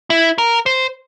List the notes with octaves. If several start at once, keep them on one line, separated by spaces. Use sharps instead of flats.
E4
A#4
C5